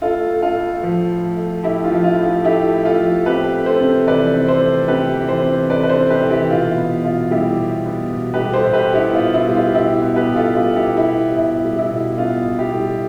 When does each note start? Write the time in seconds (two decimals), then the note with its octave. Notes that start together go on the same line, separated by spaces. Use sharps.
0.02 A2 F4 A4
0.29 A3
0.42 F4 A4
0.56 A2
0.83 F3
1.10 A2
1.37 A3
1.63 A2 E4 G4
1.84 F4
1.91 F3
2.04 F4
2.18 A2
2.25 F4
2.44 A3 E4 G4
2.73 A2
2.85 F4 A4
2.99 F3
3.26 C4 G4 B4
3.53 A3
3.66 A4 C5
3.81 C3
4.07 E3 B4 D5
4.34 C4
4.48 A4 C5
4.62 A3
4.88 C3 G4 B4
5.15 E3
5.28 A4 C5
5.42 C4
5.70 A3 B4 D5
5.83 B4
5.89 A4 C5
5.96 C3
6.10 G4 B4
6.23 E3
6.30 E4 G4
6.51 B2 F4
6.78 B3
7.04 B2 F4
7.31 G3 E4 G4
7.58 B2
7.86 B3
8.12 B2
8.34 G4 B4
8.39 G3
8.54 A4 C5
8.67 B2
8.73 G4 B4
8.94 B3 E4 G4
9.14 F4
9.20 B2
9.34 E4
9.49 G3
9.55 F4
9.74 B2 E4 G4
10.02 B3
10.16 G4 B4
10.29 B2
10.36 F4 A4
10.56 G3 F4
10.76 E4 G4
10.83 B2
10.97 E4 G4
11.10 B3
11.38 B2 E4
11.65 G3
11.78 E4
11.92 B2
12.18 B3 F4
12.46 B2
12.58 E4 G4
12.73 G3